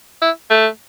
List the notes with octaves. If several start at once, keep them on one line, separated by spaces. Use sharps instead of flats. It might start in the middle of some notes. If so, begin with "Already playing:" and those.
E4
A3